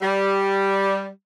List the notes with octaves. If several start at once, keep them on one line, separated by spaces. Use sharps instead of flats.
G3